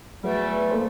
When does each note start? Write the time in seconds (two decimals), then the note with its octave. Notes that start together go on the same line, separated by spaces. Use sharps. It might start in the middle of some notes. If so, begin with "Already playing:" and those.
0.24 E2 F#3 G3 A3
0.71 A#3 A4 C5